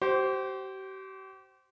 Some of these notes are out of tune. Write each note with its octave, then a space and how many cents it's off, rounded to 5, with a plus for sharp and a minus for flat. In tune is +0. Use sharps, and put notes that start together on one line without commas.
G4 -40 C5 +0